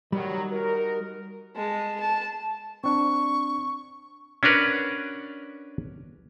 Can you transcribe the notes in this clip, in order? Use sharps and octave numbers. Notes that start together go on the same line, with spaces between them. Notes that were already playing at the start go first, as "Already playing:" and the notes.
D#3 F#3 G3
D#4 F#4 A#4
G#3 A5
A5
C4 D4 C#6
C#4 D4 F#4 A#4 B4